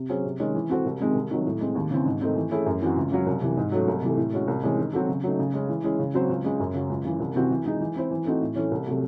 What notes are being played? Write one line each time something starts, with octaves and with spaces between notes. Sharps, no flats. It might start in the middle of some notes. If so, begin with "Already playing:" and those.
Already playing: C3
F#3 C#4 G#4 C5
C3
D#3 G#3 C#4
E3
C4 F#4 A4 C5
C2
C3 D#3 G#3 C4
C2
C3 D#3 F#3
A2
G#3 C4
D#2
C#3 E3 C4
G#2
D#3 A3 C4 D#4
E3
A3 C#4 E4 G#4
F#2
E3 C4 F#4
C#2
C#3 F#3 C#4
C2
C3 E3
G#2
F#3 A3 C#4 F#4
C2
C3 E3 A3
A2
G#3 C#4 F#4
C2
C3 E3 G#3 C#4
D#3
F#3 C4 F#4 A4
C#3
F#3 A3 D#4
C#3
G#3 C#4 G#4
E3
G#3 C#4 E4 G#4
C#3
F#3 C4 F#4 C5
C#2
C#3 G#3
F#2
C#3 F#3
C#2
C#3 E3
C2
C3 E3 C4 F#4
E3
G#3 D#4 G#4
E3
C4 E4 C5
E3
A3 C4 D#4 F#4
A2
E3 A3 C#4
C2
C3 F#3 A3